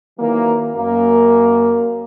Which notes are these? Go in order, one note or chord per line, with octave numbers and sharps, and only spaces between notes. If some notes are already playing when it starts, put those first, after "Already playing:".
D#3 E3 F#3 A#3
F#2 A#3